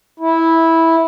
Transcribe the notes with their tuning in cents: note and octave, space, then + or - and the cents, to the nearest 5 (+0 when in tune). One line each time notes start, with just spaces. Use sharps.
E4 -10